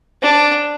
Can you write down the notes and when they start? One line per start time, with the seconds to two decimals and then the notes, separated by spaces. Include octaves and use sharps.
0.23 D4